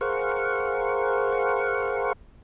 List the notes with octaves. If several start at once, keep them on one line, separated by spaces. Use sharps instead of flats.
G#4 A#4 C5 F5 F#5 C#6